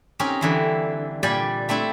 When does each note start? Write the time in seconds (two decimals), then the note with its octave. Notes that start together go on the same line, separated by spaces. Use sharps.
0.19 C4 C#4 D#4 G4 A#4
0.41 D3 E3 G3
1.23 A#2 G3 D5 G5 G#5
1.69 A3 C4 D4 E4